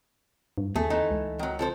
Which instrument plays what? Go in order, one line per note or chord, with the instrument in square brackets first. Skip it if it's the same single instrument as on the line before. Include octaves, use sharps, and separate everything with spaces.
[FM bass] G2
[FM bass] D#2 [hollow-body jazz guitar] A3 G#4
[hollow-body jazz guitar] E3 A3 D#4
[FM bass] C#2
[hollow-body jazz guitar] D#3 F#3
F3 A4 C5